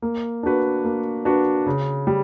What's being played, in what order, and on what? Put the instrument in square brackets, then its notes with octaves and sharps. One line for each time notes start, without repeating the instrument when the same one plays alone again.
[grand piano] A#3
D4 F#4 B4
A#3
D4 F#4 B4
C#3
G3